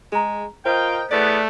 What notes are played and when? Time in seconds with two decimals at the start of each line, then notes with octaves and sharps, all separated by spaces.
0.12 G#3 G#4 A#5
0.66 F4 A#4 C5 D#5 G5
1.11 E2 A3 B3 D5